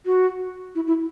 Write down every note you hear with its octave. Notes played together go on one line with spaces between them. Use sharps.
F#4
E4
E4